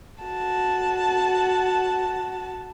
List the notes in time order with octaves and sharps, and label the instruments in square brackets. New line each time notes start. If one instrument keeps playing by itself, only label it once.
[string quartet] F#4 A5